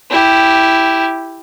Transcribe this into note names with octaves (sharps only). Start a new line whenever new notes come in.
E4 G4